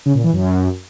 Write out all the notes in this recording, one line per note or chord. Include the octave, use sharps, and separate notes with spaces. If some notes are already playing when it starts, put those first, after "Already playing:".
C#3
A#2
E3
F#2